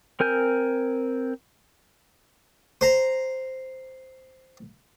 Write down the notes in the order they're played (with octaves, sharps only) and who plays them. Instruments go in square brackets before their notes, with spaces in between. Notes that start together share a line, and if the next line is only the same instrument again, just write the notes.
[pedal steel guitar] C4 A#4 G#5 G6
[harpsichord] C5 A#5